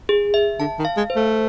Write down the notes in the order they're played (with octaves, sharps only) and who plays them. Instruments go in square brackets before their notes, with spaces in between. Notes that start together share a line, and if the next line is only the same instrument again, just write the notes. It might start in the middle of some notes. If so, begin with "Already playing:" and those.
[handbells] G#4
E5
[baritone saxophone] D3 [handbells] A5
[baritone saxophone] D#3
[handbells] F5
[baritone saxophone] G#3
[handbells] C5
[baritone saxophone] A3